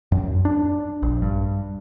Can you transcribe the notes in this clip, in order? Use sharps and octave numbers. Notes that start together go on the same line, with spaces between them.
F#2
D4
A#1
G2